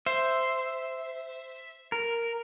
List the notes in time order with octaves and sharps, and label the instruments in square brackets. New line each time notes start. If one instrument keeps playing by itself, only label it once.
[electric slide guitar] C5 [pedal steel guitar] E5
[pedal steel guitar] A#4